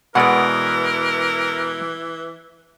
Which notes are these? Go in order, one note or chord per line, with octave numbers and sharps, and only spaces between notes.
B2 E3 G#3 A#4 B4 D5 F#5